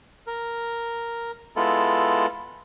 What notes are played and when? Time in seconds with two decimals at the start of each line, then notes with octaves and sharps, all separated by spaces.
0.27 A#4
1.56 G#3 B3 E4 F4 A4